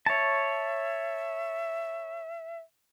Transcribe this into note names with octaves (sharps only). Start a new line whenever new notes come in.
C#5 E5 A5